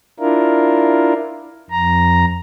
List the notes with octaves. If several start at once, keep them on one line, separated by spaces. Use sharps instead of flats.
D4 E4 F4 A#4
F2 A#5